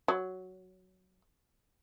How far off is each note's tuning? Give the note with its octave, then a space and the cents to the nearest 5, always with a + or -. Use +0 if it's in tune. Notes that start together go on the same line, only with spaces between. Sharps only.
F#3 +5